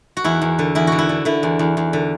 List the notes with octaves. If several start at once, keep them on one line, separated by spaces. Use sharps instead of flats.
F#4
E2 E4
E2
D3
E2 E4
D3 F#4
E4
D3
D3 E4
E2
E2
E2
D3